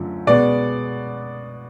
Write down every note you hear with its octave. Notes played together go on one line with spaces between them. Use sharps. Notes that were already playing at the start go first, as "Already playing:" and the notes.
Already playing: F#2 D3 F3 A3
B2 G#3 B3 D5